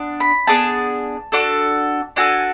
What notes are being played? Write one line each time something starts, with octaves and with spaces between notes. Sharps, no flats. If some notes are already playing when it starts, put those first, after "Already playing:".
Already playing: B3 D4
B5
B3 D4 G#4 A5
D4 F#4 A4
D4 F#4 A4 G#5